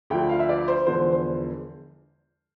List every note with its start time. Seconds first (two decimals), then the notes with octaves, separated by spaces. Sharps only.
0.10 D2 D3 F3 G5
0.29 F5
0.39 E5
0.49 D5
0.68 C5
0.87 E1 E2 D3 F3 C5
1.12 C5